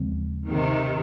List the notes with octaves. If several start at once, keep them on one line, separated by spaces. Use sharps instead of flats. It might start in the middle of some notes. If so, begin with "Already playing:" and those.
Already playing: D#2 C#3 F3 G#3 C4
C3 D#3